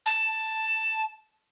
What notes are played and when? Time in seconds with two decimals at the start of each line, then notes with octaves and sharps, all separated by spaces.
0.06 A5